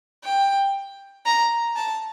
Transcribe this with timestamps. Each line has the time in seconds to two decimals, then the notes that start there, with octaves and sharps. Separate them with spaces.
0.24 G5
1.26 A#5
1.76 A5